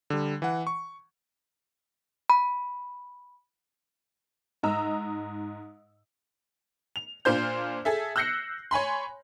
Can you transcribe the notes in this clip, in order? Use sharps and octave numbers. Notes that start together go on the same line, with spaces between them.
D3 G3
E3 F#5
C#6
B5
G#2 D#5 A#5 E6
F7
A#2 D4 F4 C5 G6
G#4 A4 E5
E6 F#6 G6 A#6 C7 C#7
C#5 G#5 B5 C6